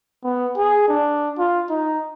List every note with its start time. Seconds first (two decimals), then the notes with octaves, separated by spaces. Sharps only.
0.24 B3
0.57 G#4
0.88 D4
1.39 F4
1.70 D#4